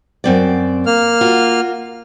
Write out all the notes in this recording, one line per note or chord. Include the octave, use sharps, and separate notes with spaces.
F#2 C4 D5
A#3 F6
F4 F#4